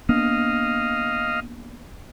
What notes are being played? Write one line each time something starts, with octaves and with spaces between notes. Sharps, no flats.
A#3 B3 D4 D#5 F5